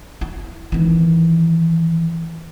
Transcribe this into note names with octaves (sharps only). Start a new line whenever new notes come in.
E4
D#3 E3